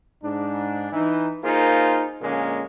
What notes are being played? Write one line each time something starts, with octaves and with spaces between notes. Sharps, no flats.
G#2 D4
E3 D#4
A#3 D#4 F4 G#4 A#4 C5
A#2 D3 G#3 A#3 C#4 D4